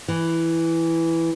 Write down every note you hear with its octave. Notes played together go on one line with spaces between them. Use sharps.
E3